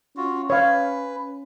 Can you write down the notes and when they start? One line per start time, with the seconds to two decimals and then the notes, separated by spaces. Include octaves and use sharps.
0.17 C#4 F4 F#4
0.50 B4 C#5 F5